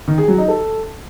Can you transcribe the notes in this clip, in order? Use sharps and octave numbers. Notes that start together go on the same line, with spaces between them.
D#3
G#4
F#3
D#4
A4